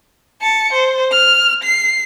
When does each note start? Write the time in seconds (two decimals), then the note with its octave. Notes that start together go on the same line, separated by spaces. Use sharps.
0.42 A5 C#7
0.73 C5
1.11 F6
1.63 C7